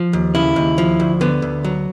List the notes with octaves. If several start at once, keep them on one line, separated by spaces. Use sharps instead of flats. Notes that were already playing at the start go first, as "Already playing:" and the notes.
Already playing: F3
D#2
C#3 E4
D#2
F3
D2
D3 B3
D2
F#3